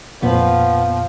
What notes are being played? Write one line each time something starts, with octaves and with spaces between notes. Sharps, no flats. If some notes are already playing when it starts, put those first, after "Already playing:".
F2 A#2 F3 B3